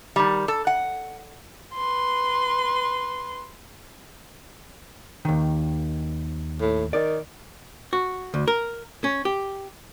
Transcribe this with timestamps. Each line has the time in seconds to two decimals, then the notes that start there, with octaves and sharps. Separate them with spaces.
0.16 D#3 G3
0.48 A4
0.67 F#5
1.75 B4 C6
5.25 D#2 D#3
6.61 A2
6.93 D#3 D5
7.93 F#4
8.34 D2
8.48 A#4
9.04 C#4
9.25 G4